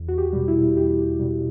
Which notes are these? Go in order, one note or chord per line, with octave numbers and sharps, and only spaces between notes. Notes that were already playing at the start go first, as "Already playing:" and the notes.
Already playing: E2
F#4
G4
B2 G3
E4
E2 G4
B2 G3